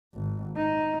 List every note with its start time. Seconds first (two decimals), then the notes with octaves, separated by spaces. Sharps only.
0.15 G#1
0.56 D#4